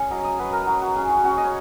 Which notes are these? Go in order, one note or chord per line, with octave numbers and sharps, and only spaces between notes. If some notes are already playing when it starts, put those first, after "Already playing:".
Already playing: C#4 G#4 C#5
F#3 D#5
D#5
F#3 B4
A#4
F#3 F#4
F#4
C#4 G#4
F#4
C#4 F#4
D#5
C#5